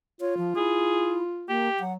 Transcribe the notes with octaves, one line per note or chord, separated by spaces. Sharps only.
F4 C#5
F3
E4 G#4
A#3 G4
F#3 F#5